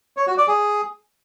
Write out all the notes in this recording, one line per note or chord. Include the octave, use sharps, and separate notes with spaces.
C#5
F#4
D5
G#4